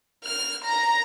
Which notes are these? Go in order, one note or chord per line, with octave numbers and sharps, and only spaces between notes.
F6
A#5